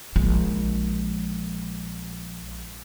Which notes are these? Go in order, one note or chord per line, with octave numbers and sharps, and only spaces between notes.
A#1 G#3